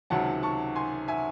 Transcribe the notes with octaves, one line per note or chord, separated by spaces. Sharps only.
C#2 C3 D#3 F#3 F#5 A5
A5 C#6
G#5 C6
E5 G#5